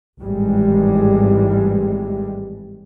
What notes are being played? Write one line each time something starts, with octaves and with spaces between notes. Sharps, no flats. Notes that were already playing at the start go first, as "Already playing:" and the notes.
G#1 A2 E3 G3 G#3